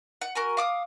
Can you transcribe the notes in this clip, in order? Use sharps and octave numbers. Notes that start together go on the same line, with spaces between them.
F#5
F#4 A#4 G#5
F5 D6 D#6